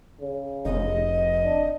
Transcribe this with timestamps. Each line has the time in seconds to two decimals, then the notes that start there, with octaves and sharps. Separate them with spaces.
0.21 C#3
0.65 F1 D#5
1.44 D4